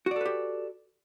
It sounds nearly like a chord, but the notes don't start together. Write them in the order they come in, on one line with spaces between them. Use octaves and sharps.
F#4 D5 A4 B4 G4